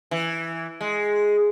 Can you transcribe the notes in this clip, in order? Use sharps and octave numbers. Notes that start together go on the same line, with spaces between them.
E3
G#3